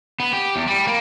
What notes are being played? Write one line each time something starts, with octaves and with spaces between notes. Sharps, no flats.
B3
G4
E2
G3
A#3